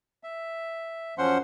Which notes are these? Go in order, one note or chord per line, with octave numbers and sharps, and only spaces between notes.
E5
F#2 F3 C#4 C5 F#5 C6